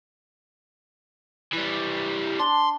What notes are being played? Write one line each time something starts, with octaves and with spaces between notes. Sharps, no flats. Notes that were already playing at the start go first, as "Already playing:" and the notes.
E3 G3
D4 C6